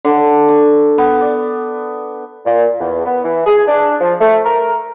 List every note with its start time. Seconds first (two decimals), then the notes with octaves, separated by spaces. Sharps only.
0.05 D3
0.49 C#6
0.98 B3
1.21 D5
2.46 A#2
2.80 E2
3.05 B3
3.24 E3
3.46 G#4
3.68 D4
4.01 F3
4.21 A3
4.45 A#4